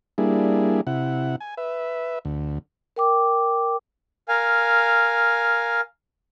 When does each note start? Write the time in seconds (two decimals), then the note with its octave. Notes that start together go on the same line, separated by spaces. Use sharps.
0.18 G3 A#3 D4 E4 G#4
0.87 C3 E4 F#5
1.40 G#5
1.57 B4 E5
2.25 D2
2.96 A#4 G5 D6
4.28 A#4 F5 G#5